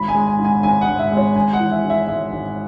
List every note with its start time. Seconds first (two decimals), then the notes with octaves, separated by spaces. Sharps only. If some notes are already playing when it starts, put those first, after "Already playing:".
Already playing: G#1 B5
0.08 G#5
0.15 G#3
0.27 G#5
0.39 G#2
0.44 G#5
0.63 G#1 G#5
0.81 F#5
0.88 G#1
0.99 E5
1.11 G#3
1.17 C#5
1.36 G#1 G#5
1.53 F#5
1.59 E3
1.72 E5
1.84 G#2
1.90 E5
2.08 G#3 E5
2.32 G#1